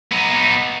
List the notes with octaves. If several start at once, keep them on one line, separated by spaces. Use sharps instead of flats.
B3 D#4